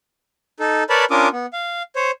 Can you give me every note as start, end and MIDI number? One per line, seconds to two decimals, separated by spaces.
0.60 0.84 63
0.60 0.84 69
0.89 1.05 70
0.89 1.05 71
0.89 1.05 73
0.89 1.05 74
0.89 1.05 81
0.89 1.05 83
1.10 1.29 61
1.10 1.29 62
1.10 1.29 65
1.10 1.29 70
1.10 1.29 86
1.10 1.29 87
1.33 1.46 59
1.53 1.83 77
1.96 2.11 72
1.96 2.11 73